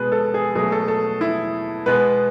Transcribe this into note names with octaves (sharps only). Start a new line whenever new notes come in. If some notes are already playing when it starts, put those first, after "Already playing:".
Already playing: B2 G#3 B4
A4
G#4
B2 F#3 A3 G#4
A4
A4
E4
B2 G#3 B3 B4